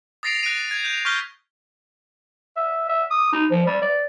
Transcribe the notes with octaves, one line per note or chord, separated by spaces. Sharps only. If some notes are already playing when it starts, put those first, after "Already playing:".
D#6 A6 A#6 C7 D7 F7
F#6 A#6 D7 D#7
G#6
G6 F7
C#6 F6 G6 B6 G7
E5
E5
D#6
D#4
F3
G3
D5